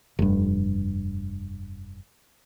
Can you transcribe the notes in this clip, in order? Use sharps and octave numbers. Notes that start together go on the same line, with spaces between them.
F1 G2